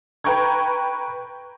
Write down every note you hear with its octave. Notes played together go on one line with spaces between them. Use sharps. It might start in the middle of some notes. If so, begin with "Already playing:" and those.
B4 G5 A#5 C#6 G#6